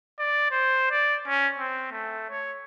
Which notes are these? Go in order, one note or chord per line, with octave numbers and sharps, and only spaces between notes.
D5
C5
D5
C#4
C4
A3
C#5